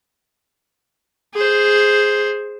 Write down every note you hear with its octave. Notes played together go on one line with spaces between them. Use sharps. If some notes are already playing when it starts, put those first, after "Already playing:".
G#4 C5